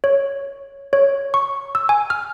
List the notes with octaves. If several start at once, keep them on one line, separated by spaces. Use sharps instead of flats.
C#5
C#5
C#6
E6
G#5
F6